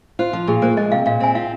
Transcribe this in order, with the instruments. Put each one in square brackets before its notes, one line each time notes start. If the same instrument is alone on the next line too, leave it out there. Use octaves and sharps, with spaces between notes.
[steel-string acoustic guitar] F4 [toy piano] C5
[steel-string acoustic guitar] F3
[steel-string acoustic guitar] A#2 [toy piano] G#4
[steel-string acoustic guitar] A#3 [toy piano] C5
[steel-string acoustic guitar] G#3 [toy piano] D#5
[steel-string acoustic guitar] C3 [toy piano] F5
[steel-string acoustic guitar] A#2 [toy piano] F5
[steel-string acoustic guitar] C4 [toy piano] G#5
[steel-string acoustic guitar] F4 [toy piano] F5